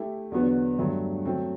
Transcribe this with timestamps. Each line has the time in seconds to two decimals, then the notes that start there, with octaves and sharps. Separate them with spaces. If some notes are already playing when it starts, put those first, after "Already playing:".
Already playing: A3 E4 G4
0.32 E2 D3 F#3 B3 F#4
0.79 G2 F#3 A3
1.25 F#3 A3 C4